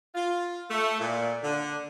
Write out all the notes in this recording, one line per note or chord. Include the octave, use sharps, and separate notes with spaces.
F4
A3
A#2
D3